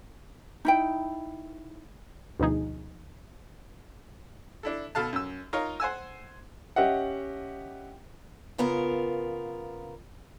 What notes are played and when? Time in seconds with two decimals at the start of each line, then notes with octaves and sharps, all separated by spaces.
0.65 D#4 E4 G5
2.40 D2 B2 F3 D#4 G#4
4.63 D4 E4 A4
4.95 B2 A4 F5 A5
5.13 F#2 E6
5.53 D#4 F4 A#4 C#5
5.80 C5 F#5 G#5 E6
6.76 C#4 G4 D#5 E5 F#5
8.58 C#3 B3 F4 A#4